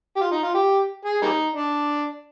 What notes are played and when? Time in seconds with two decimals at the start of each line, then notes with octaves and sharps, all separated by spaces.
0.16 G4
0.21 F4
0.32 D#4
0.43 F4
0.55 G4
1.05 G#4
1.22 G3 A#3 D#4
1.56 D4